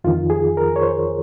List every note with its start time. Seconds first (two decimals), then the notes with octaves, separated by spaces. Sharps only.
0.04 F2 D#3 F4
0.30 G#4
0.57 A#4
0.76 C#5
0.82 C5